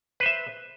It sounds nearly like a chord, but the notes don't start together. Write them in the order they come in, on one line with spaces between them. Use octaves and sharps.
B4 C5 E5